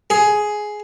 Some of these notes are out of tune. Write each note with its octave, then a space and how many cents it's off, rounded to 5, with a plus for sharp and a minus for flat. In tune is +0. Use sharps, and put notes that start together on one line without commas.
G#4 +10